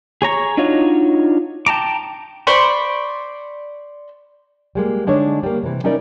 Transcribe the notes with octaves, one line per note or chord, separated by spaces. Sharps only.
G#4 C#5 A#5 C#6
D4 D#4 F4 F#4 C#5
G5 A5 A#5 D6
C5 D5 B5 C#6
G3 G#3 A#3
D3 G#3 D4 D#4 C#5
G3 A#3
C3 E3
G3 C#4 D#4 E4 A#4 D5